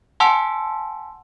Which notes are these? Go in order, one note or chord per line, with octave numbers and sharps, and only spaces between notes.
F#5 G#5 A5 C6 E6